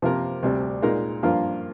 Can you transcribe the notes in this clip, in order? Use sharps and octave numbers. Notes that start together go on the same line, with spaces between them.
C3 F3 A#3 F4 A#4
D2 C3 G3 D4
A#2 G#3 D#4 A#4
G2 F3 A#3 F4 A#4